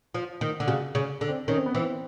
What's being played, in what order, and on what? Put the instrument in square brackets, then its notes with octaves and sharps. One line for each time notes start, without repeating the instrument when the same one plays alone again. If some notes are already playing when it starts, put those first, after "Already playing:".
[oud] F3
D#3
D3
[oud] C#3 [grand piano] F#4
[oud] C#3
D3
[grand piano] C4
[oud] D#3 [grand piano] C#4
[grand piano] C4
B3
[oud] E3 [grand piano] C4